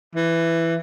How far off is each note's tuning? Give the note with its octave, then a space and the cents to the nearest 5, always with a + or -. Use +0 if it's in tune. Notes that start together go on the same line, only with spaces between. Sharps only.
E3 +10